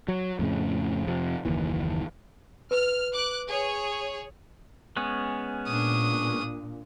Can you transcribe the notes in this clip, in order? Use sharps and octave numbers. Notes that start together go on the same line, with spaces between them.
F#3
F2 A2 C#3
F2 C3
F#1 D#2 E3
B4 F6
D6 F#6
G#4 C#5
G#3 B3 C#4
A#2 D4 D#6